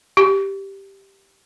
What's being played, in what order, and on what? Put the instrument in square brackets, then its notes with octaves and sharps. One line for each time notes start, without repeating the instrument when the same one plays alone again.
[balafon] G4